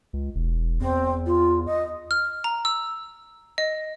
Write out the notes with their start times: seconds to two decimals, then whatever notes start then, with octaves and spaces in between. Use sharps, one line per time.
0.13 C#2
0.35 E1
0.81 E2 C4
1.26 F4
1.66 D#5
2.11 F6
2.44 A#5
2.65 E6
3.58 D#5